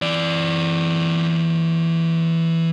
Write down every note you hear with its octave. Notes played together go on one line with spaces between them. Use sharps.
E3 D5